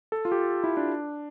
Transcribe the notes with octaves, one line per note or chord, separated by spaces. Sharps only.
A4
F4
G4
E4
D4